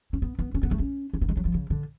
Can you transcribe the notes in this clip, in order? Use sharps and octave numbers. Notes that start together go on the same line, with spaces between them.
C#4
B3
B3
C#4
B3
A3
C#4
C#4
B3
G#3
F#3
F3
C#3
D3